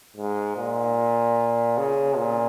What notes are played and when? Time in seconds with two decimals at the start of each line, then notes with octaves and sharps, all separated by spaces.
0.17 G#2
0.57 A#2
1.78 C#3
2.18 A#2